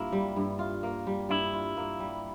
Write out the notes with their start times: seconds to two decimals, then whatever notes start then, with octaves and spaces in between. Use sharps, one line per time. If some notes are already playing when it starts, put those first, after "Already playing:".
Already playing: G2 A#3 E4 F4
0.12 G3
0.36 G2
0.59 F4
0.83 A#3
1.07 G3
1.29 G2 E4
1.54 F4
1.77 A#3
1.99 G3